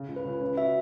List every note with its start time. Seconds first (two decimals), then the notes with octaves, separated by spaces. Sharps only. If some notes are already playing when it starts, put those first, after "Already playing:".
Already playing: C#3
0.08 C#2
0.16 B4
0.25 C#3
0.41 C#4
0.57 F#4 E5